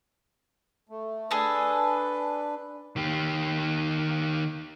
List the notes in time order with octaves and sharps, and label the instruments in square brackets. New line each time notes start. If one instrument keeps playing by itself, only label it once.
[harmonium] A3
[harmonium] D4 B4 [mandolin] G#4 A4
[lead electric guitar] D#3 G4